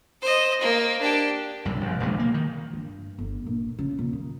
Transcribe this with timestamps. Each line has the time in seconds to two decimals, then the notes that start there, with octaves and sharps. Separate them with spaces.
0.22 C5 D#5
0.61 A#3
1.01 D4 G4
1.65 B1 G2 C3
1.81 A#1
2.00 D#1 A#1 C#3 G#3
2.19 A#3
2.34 D#3
2.73 G2
3.18 G1
3.46 A#1
3.79 C#3
3.99 D#1
4.13 D#3